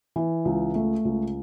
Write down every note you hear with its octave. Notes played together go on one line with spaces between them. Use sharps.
E3
C#2
A3
C#2